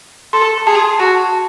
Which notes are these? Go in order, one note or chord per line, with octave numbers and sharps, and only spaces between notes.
A4 C6
C6
G#4 A5
F#4 A5